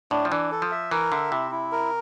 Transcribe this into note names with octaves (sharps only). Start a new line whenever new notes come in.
A2 D4
F3
E3 D4
A4
F3
E5
E3 A#4
D3 E5
C3 E4
E4
A#4